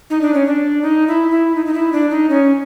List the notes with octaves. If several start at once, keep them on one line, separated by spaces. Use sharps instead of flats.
D#4
D4
C#4
D4
D#4
E4
E4
D#4
D#4
E4
D4
D#4
C#4